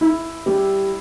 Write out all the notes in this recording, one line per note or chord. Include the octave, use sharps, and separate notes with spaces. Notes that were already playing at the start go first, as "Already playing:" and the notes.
E4
G3